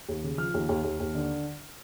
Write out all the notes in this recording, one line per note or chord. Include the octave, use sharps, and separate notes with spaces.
D#2
C#3
F3 F6
D#2
D#2
D#2
D#2
D3